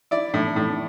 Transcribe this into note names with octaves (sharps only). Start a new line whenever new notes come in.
E4 D5
A2
A2